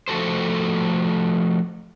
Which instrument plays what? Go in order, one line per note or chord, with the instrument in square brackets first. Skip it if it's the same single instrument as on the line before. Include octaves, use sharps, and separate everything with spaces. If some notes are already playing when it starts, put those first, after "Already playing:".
[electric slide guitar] F3 A3 F#4 A4 C5